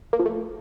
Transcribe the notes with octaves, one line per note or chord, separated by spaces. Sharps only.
A#3
F3
A3